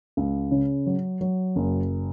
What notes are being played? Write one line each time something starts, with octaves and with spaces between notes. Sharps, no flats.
C#2
C#3
F#3
F#3
F#1